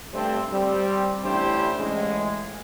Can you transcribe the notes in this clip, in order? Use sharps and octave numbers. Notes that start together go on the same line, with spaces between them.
G2 G3 A3 C4
G3 C4
A1 A2 D4 E4 G4 C5
A1 G#3